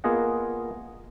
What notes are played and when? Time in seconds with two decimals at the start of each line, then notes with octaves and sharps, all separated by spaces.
0.04 A#3 B3 F4 G#4 D#5 F#5